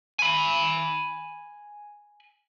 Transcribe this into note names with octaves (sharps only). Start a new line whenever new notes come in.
G#5 B5